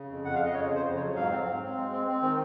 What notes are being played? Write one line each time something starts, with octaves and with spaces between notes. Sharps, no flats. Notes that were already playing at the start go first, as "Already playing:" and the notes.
Already playing: C#3
F2
F2 F#5
C#3 F5
D#5
F2 C#5
C#3 C5
F2
C#5
F#3
G#2 F5
C4
C4
C4
G#3
C4
C4
D#3